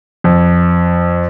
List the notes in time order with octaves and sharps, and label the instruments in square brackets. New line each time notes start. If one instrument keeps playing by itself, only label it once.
[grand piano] F2